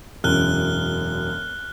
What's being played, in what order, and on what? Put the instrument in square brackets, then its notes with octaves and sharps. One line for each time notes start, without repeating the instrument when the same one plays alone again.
[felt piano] E1 F#2 [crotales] F6 F#6 G7